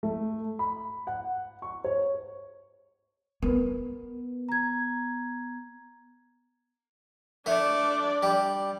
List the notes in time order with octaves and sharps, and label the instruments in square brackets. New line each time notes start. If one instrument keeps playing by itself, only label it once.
[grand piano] A3
B5
F#5
C#6
C#5
[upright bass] B3 [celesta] A#4 B4
[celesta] A#5 G#6
[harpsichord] A3 [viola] D4 D5
[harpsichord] G3